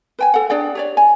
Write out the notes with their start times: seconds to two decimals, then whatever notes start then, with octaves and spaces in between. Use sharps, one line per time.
0.19 B4 G5 G#5
0.34 A4 F#5
0.50 D4 G#4 D5 G5
0.75 G4 C#5 D5
0.97 G#5